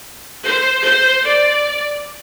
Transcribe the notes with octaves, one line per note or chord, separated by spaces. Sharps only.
C5
C5
D5